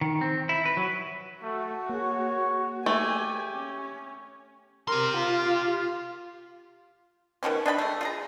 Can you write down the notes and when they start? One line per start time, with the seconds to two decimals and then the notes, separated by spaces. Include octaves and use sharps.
0.01 D#3
0.21 C4
0.49 E4
0.65 B4
0.77 F#3
1.43 A3 F#4
1.90 A#3 G#4 C#5
2.86 A3 G4 G#5
3.52 C#4
4.88 G4 A#4 C6
5.17 F4
7.43 B2 D#3 F3 C#4
7.66 D4 D#5 G#5 B5
7.78 G#3 A3
8.01 F4 G#4 A#5